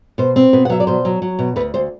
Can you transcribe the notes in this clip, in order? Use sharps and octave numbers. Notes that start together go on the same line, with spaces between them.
B2 C5
C4
B2 B4
F#5
F#3 E5
D5
B2 C5
F#3
F#3
B2
D2 B4
D2 C5